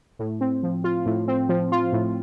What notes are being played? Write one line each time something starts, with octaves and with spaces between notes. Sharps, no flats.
A2
C4
F3
F4
A2
C4
F3
F4
A2